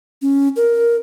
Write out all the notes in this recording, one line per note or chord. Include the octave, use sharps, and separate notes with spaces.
C#4
A#4